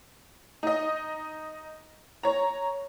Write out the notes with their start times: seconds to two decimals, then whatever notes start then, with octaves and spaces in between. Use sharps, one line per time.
0.63 D#4 D#5
2.23 C#5 A#5